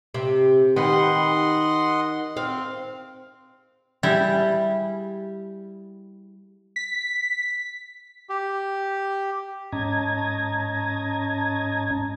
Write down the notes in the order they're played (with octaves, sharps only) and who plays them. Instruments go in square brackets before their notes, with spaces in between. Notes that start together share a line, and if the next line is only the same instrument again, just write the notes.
[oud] C3
[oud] D#3 G4 B4 [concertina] D#5 F#5 C6
[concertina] C4 [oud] F5
[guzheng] G3 E4 G#4
[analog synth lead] B6
[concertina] G4
[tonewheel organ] G#2 C#4 D#5 A5 A#5 G#6